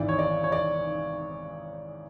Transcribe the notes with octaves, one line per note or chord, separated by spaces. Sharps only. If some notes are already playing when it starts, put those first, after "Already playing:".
Already playing: G#1 G#2 E3 D5
C#5
D5
C#5
D5